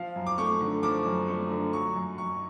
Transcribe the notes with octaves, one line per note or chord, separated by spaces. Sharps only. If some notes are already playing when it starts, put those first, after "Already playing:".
Already playing: F3 F5
F#2
D6
A3 C#6
D3
F3 D6
F#2
A3
D3
F#3 C#6
F#2
F#2 C#6